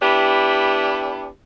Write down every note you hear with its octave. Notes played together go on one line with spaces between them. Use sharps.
B3 D4 E4 G4